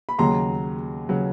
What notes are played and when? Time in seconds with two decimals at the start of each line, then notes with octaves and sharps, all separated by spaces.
0.09 B5
0.19 D#2 C#3 F#3 A#5 C6
1.09 C#3 F#3